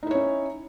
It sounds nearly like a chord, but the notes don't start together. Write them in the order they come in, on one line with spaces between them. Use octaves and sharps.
D#4 E4 C#5 C#4